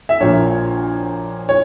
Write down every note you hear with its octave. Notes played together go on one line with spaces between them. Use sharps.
E5
A#1 A#2 F3 A#3 C#5
C#5